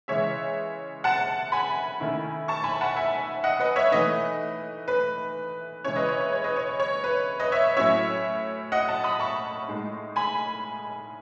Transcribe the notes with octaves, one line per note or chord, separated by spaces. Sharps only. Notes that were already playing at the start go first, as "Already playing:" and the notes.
C#3 E3 G#3 C#5 E5
F#5 A5
G#5 B5
D#3 A3 C#4 E4
A5 C#6
G#5 B5
F#5 A5
E5 G#5
D#5 F#5
B4 D#5
C#5 E5
E3 A3 D#4 B4 D#5
B4
C#3 E3 G#3 C#4 E4 C#5
B4 D#5
C#5
B4
C#5
B4 D#5
C#5
C#5
C#5
B4
B4 D#5
C#5 E5
A2 F#3 C#4 E4 C#5 E5
D#5 F#5
F#5 A5
B5 D#6
A5 C#6
A2 G#3 D#4
G#5 B5